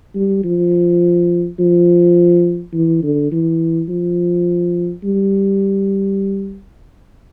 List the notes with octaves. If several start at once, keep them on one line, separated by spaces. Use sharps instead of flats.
G3
F3
F3
E3
D3
E3
F3
G3